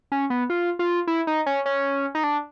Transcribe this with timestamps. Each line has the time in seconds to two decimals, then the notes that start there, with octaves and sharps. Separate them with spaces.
0.12 C#4
0.30 B3
0.50 F4
0.79 F4
1.07 E4
1.27 D#4
1.46 C#4
1.66 C#4
2.15 D#4
2.24 D4